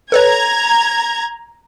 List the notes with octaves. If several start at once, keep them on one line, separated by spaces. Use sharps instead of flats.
A4 B4 C#5 A#5 G#6